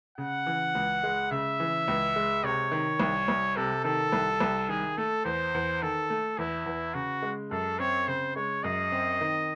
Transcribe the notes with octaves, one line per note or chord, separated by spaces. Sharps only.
C#3 F#5
E3
C#2
G#3
C#3 E5
E3
C#2
G#3
C3 C#5
D#3
C2
C2
C3 A4
D#3 A4
C2
C2
D#3 G#4
A3 A4
E2 C5
E2
D#3 A4
A3
E2 E4
E2
C#3 F#4
G#3
F#2 A4
C4 C#5
C#3 C5
G#3 C#5
F#2 D#5
C4
D#3